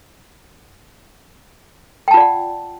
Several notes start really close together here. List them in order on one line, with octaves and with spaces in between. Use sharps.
G5 A5 F4 D5 F#5